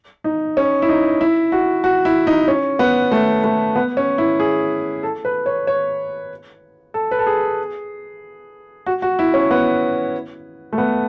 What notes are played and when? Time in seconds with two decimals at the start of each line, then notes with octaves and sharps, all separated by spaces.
0.24 D#4
0.57 C#4
0.82 E4
0.89 D#4
1.21 E4
1.52 F#4
1.84 F#4
2.05 E4
2.27 D#4
2.48 C#4
2.79 B3
3.12 A3
3.44 A3
3.76 B3
3.97 C#4
4.18 E4
4.40 G#4
5.03 A4
5.25 B4
5.46 C#5
5.67 C#5
6.94 A4
7.11 B4
7.19 A4
7.27 G#4
8.86 F#4
9.02 F#4
9.19 E4
9.34 C#4
9.51 B3
10.73 A3
10.78 B3